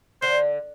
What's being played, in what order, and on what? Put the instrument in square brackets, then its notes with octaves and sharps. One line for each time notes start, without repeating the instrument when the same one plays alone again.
[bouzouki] D3 [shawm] C5